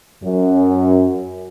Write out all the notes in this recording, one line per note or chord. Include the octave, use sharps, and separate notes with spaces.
F#2